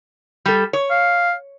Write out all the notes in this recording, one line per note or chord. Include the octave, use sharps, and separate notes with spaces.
G3 A4
C#5
F5